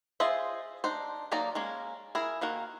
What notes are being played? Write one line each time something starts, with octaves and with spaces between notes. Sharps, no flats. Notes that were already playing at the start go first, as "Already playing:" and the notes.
F4 G#4 C5 D#5 E5
D4 D#4 C5
F#3 A#3 D#4 D5 A#5
G#3 A#3 C#4
E4 G#4 A#4
D#3 A#3 F#4 A#4